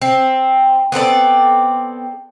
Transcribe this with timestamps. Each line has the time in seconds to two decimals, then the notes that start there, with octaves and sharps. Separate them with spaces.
0.02 C4
0.92 B3 C4 A4 D5